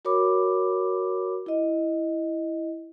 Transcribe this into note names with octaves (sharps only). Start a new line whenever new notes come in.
F#4 A#4 C#5 B5 D6
E4 D#5